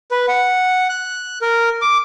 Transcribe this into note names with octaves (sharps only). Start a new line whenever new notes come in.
B4
F#5
F#6
A#4
D6